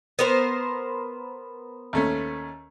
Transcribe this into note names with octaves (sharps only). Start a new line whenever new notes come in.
B3 A#4 C5
D#2 A3 C#4